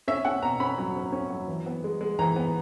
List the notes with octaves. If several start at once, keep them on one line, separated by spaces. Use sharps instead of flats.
C#4 E5
C#4 F#5
B2 A#5
C#4 B5
F#3
C#4
C#4
F#3
E3
B3
G#3
G#3
E3 A#5
B3